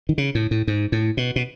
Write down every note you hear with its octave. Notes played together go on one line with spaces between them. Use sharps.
D#3
C#3
A2
A2
G#2
A2
B2
B2